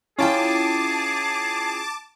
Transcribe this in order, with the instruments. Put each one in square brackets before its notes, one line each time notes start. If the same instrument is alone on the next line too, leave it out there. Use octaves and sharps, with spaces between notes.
[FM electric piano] C#4 F4 [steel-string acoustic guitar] E4 G5 [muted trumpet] G#4 [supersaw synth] A5 D6